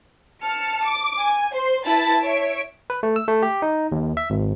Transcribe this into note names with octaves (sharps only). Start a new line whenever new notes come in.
A5 F6 C#7
D6
G#5
C5 C6
E4 B4 A5 A6
C#5 E5 D7
B4
A3
E6
A3
G4
D#4
D#2
E5
G#1